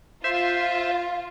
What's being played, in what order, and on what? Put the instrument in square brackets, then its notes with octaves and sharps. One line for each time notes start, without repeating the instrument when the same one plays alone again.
[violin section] F4 [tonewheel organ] C5 E5